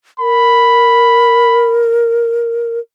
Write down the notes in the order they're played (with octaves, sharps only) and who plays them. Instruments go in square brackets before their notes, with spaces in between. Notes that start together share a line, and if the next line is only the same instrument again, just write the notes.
[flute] A#4 [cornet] B5